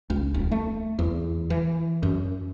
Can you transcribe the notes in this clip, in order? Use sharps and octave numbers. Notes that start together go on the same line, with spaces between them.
C#2
D#1
A3
E2
E3
F#2